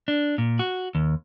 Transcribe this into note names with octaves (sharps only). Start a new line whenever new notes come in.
D4
A#2
F#4
D#2